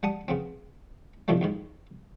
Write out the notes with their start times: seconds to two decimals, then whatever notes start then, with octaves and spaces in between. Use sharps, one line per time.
0.03 G3 F#5 A5 D#6
0.28 C#3 B3 C4
1.28 F2 A2 C3 D#3 F3 G3
1.41 D#2 G#2 D#3